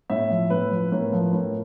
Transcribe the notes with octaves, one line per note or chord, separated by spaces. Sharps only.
A2 E5
F3
A2 B4
F3
A2 A#4
F3
A2